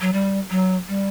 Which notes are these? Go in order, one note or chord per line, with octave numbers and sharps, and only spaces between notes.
F#3
G3
F#3
G3